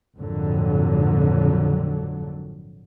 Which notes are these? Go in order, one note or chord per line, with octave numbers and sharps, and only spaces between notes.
G#1 F2 A#2 D3 F#3